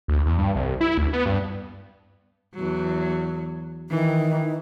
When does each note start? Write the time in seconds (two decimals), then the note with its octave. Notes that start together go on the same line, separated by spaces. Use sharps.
0.08 D2
0.26 E2
0.38 G2
0.56 C2
0.81 E4
0.97 D2
1.13 B3
1.26 G2
2.55 E2 F#3
3.90 D#3 E3